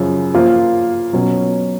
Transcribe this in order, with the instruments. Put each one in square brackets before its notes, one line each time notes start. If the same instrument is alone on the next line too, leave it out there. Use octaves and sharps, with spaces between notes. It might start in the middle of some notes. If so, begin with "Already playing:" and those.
Already playing: [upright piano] F#2 C#3 F3
F3 A#3 F4
B2 F#3 C#4